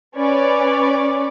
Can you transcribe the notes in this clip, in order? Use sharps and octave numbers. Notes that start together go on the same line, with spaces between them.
C#4 B4 C#5 D5